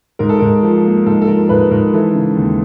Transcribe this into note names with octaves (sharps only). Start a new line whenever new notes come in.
G#2 A#4
A4
G#2 A#4
F3
A#3
G#2 A4
A4
F3 A#4
G#2 B4
G#2 A#4
E3 A4
C#3
D#2